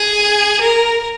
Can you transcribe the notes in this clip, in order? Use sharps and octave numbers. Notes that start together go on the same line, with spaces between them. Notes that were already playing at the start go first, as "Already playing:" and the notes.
Already playing: G#4
A#4